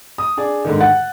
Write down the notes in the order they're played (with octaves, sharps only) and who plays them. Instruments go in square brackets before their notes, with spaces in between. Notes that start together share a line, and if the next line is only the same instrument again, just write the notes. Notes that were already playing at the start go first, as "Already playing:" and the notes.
[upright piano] D#6
D4 G#4 D5
G#2 D3 D#3
[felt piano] F#5 [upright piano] A6